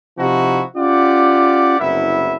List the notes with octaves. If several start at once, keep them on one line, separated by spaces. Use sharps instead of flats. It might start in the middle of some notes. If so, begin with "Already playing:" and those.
C3 F3 D#4 E4 F#4
C#4 F4 G4 D5 F#5
F#1 C2 B3 E4 E5